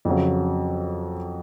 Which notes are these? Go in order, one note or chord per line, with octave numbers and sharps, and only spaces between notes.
F2 C#3 F#3